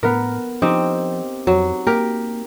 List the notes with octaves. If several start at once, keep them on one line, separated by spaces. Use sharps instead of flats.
A2 B3 A#4
F3 C4 D#4 G4
F2 F#3
A#3 G4 A#4